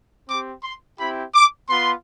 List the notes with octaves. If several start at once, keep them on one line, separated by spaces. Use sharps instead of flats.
C4 G4 D6
C6
C4 E4 G4 B5
D6
B3 F4 C6